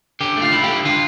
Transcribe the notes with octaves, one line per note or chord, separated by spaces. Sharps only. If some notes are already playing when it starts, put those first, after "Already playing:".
D3 G4
A3 F4
E4
G4
D3
D3 F4